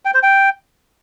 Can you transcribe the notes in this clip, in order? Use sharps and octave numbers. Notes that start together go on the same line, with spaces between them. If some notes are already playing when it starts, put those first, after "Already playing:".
G5
C5
G5